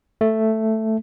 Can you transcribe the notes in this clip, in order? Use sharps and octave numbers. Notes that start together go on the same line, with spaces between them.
A3